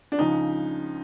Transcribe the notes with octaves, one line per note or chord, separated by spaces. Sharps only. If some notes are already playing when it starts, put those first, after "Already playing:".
D4
C#2 C#3 F3 D#4